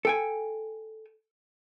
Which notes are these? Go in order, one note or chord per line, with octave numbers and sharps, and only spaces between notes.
A4 G5 G#5